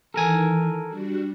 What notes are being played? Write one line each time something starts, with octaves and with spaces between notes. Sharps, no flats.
D#3 E3 A4 A#4 G#5
G3 D4 F#4